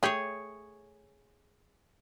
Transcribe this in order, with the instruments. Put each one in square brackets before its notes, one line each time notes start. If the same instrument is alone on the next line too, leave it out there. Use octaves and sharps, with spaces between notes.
[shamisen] A3 G4 [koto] G#4 C#5